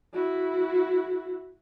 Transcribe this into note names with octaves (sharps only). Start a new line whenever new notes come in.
E4 F#4